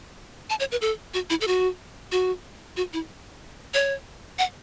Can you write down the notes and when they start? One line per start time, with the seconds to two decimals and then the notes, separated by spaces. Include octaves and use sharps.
0.50 A5
0.60 C#5
0.72 B4
0.81 A4
1.14 F#4
1.30 E4
1.41 A4
1.47 F#4
2.12 F#4
2.77 F#4
2.93 E4
3.74 C#5
4.39 F#5